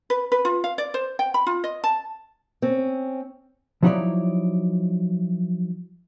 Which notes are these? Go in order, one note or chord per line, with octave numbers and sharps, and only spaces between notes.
B4
B4
F4
F5
D5
C5
G5
B5
F4
D#5
A5
C4 C#4
F3 F#3 D#4 E4 C#5 D5